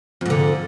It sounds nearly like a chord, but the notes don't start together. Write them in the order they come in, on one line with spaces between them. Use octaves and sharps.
F2 G#2 D3